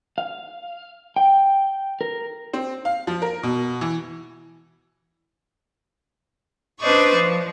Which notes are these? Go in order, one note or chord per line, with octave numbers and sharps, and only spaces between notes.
F5
G5
A#4
C4
F5
F3
A#4
B2
E3
D4 B4 C5 D5 D#5 C#6
F3